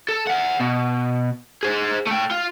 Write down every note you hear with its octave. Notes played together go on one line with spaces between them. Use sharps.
A4
E5 F#5
B2
G#4 C5
A3 G5
F4